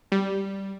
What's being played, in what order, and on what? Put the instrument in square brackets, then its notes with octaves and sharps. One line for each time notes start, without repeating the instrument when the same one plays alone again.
[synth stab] G3